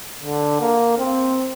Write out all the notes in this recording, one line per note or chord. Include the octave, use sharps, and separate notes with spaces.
D3
A#3
C4